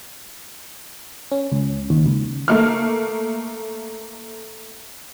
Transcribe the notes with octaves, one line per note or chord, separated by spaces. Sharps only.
C#4
C#2
D#2
C#2
A3 A#3 F6